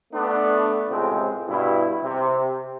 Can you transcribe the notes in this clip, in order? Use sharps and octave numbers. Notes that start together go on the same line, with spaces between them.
A3 B3 D4
C#2 A2 C3 F3 G#3 C4
G2 B2 E4
C3